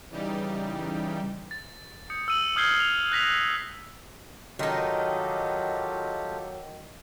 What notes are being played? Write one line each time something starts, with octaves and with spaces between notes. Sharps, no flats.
C#3 E3 G3 D#4 G4
A6
D#6 G6 C#7
E6 D#7 F#7
D#6 F6 G6 G#6 C7 G7
F7
F#6 A#6 B6 F7
D#3 F#3 D#4 F4 G4 A4